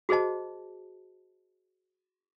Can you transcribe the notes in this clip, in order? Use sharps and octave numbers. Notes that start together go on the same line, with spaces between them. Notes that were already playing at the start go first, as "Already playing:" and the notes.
F#4 G#4 C5 D#5 A5